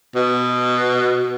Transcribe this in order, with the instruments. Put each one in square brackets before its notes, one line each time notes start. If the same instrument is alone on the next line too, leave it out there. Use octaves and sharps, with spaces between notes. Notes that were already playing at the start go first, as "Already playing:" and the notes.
[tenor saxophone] B2